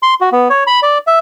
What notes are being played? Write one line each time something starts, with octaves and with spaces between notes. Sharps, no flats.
C6
F#4
B3
C#5
B5
D5
E5